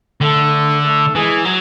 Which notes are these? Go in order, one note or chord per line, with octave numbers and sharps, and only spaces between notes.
D3 A3 A4
A3 A4
E3 G#3 G#4
F#3